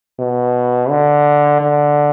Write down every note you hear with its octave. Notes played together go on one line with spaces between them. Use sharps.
B2
D3
D3